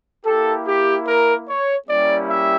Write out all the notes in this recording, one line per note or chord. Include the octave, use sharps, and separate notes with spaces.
A#3 E4 G4 A4
G4
A#4
C#5
G3 A#3 C#4 E4 G4 D5
E5